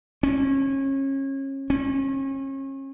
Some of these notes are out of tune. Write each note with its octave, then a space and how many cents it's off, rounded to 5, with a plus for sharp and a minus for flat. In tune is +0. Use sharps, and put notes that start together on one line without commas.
C#4 -30
C#4 -35